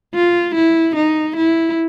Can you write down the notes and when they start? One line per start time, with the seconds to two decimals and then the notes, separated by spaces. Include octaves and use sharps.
0.15 F4
0.55 E4
0.96 D#4
1.37 E4